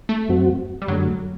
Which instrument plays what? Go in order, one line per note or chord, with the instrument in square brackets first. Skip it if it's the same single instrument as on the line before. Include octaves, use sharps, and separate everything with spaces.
[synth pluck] A3
[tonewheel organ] F#2 F#3 C4 F#4
[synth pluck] G3
[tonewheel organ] F#2 D3 A3 [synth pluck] F#3